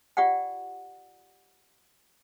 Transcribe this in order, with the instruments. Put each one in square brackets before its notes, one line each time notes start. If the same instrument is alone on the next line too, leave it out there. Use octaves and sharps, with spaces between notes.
[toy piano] F4 G4 D5 F#5 G5